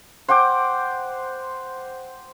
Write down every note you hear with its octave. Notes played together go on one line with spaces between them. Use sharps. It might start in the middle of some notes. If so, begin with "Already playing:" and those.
C5 F#5 G5 D6